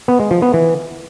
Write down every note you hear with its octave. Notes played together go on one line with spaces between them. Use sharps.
B3
G#3
F3
B3
E3